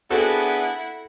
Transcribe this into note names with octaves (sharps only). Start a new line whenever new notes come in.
B3 C4 D4 E4 F#4 G#4 A4 F#5